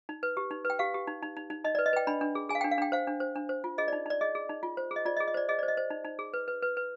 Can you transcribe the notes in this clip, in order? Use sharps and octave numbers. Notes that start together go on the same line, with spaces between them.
D#4
B4
G4
D#4
B4
G5
G4 F5
G4
D#4
D#4
D#4
D#4
D#4 D#5
D5
B4
D#5
B4 G5
D4 B5
D4
G#4
G#4 G#5
F5
G5
D4
F5
D4 G5
C5 F5
D4
C5
D4
C5
F4
G#4 D#5
D5
D#4
D#4 D5
G#4 D#5
G#4
D#4
F4
C5
G#4
D#5
F4 D5
D#5
G#4
D#5
C5 D5
G#4 D#5
C5 D5
D#5
C5
D#4
D#4
G#4
B4
B4
B4
B4